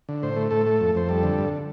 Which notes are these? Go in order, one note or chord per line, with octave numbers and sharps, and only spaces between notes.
D3
A2 C5
A3
A2 A4
A3
F2
F2 C5
G3 A4
D3
G2